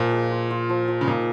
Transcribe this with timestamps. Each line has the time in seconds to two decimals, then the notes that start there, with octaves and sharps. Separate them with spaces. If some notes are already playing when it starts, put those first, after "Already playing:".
Already playing: A#2 F3
0.12 G#3
0.31 F4
0.51 F4
0.69 F3
0.88 F3
1.01 C#3
1.07 A#2 D#4